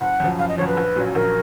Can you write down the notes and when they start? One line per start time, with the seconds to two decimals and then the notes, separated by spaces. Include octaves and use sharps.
0.01 F#1 F#5
0.20 F#2 F3
0.39 F#1 F5
0.49 D#5
0.58 F#2 F3 C#5
0.68 B4
0.77 A#1
0.96 A#2 F#3 C#4 F#4
1.15 A#1 A#4